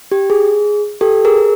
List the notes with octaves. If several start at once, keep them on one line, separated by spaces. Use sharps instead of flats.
G4
G#4
G4 A4
G#4 A#4